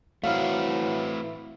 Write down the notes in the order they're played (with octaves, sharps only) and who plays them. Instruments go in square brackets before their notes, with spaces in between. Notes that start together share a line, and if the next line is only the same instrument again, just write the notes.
[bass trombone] E3 [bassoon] F#3 [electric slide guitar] A3 C4 E4 [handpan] F5